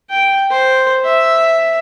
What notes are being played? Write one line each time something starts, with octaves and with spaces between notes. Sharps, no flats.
G5
C5
E5